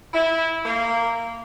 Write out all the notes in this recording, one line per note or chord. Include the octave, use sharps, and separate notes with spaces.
E4
A#3